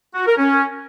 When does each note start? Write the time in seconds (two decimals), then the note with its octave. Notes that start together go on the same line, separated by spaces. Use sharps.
0.15 F#4
0.26 A#4
0.38 C#4